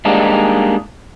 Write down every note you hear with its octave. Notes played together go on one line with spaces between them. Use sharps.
G3 G#3 A#3 D4 D#4